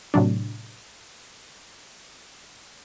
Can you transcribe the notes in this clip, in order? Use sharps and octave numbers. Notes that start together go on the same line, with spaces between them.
A2 C3 F#3 D4